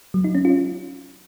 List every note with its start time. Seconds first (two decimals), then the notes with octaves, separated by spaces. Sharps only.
0.14 F#3
0.24 D#4
0.35 C#4
0.45 F4